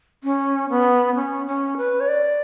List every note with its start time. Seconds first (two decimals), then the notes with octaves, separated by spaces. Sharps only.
0.24 C#4
0.70 B3
1.15 C#4
1.47 C#4
1.77 B4
2.00 C#5
2.08 D5